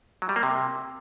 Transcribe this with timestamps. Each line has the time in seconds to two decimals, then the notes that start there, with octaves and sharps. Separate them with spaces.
0.22 F#3
0.29 G3
0.36 A#3
0.43 C3